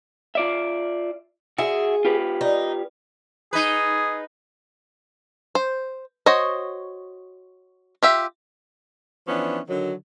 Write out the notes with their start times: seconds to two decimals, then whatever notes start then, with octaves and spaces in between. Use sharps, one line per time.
0.35 F4 D5 E5
1.58 F#4 G#4 E5
2.05 F4 G4 B4
2.41 D#4
3.53 D#4 G#4 B4
5.55 C5
6.26 F#4 C5 C#5 D#5
8.03 F4 G4 E5
9.28 E3 F3 B3 C#4 D4
9.68 D3 D#3 F#3